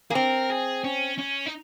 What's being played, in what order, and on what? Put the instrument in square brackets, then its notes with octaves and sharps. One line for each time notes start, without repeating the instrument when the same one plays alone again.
[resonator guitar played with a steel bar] A#3 [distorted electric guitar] G#4
[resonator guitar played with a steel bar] C4 [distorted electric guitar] A#4
[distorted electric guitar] G#4
C#4
C#4
D#4